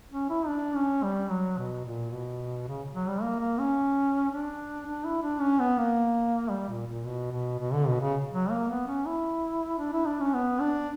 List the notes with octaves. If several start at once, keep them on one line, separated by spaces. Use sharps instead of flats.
C#4
E4
D4
C#4
G3
F#3
B2
A#2
B2
C#3
F#3
G3
A#3
A#3
C#4
D4
D4
E4
D4
C#4
B3
A#3
G3
A#2
A#2
B2
B2
B2
D3
B2
C#3
F#3
A#3
B3
C#4
E4
D4
E4
D4
C#4
B3
D4